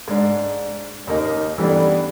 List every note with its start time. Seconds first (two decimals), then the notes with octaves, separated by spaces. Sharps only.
0.08 G#2 D4
1.07 D#2 A#3 D#4
1.58 E3 G3 A3 B3 D4